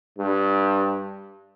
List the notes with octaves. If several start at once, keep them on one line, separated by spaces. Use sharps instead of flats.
G2